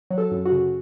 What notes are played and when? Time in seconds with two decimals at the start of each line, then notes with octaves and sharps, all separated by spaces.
0.11 F#3
0.18 A4
0.31 F#2
0.45 F#4
0.52 C#3